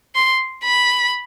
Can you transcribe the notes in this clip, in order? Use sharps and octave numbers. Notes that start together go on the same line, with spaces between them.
C6
B5